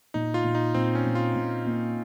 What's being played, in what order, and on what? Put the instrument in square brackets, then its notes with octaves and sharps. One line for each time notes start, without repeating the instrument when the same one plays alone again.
[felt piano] A#2 [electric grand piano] D#4
[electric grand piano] F4
[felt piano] A#2
[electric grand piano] D#4
[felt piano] A#2 [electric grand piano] C4
[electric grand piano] C#4
[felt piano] A#2
[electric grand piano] F4
[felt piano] A#2
A#3